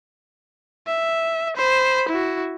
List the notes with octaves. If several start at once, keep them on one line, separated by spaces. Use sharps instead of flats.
E5
C5 B5
E4 F#4